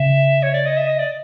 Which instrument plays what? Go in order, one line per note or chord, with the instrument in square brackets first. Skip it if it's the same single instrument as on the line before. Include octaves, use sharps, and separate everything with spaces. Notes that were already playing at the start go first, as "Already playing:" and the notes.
Already playing: [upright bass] C#3 [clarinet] E5
[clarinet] C#5
D5
D#5
E5
D#5
D5